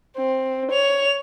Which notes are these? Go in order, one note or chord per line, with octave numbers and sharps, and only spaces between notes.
C4
C#5 F7